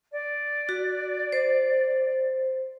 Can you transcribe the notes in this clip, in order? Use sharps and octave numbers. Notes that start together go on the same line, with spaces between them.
D5
F#4
C5